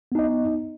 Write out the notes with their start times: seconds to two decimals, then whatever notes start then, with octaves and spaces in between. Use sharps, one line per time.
0.12 B3
0.15 D#4
0.19 D#5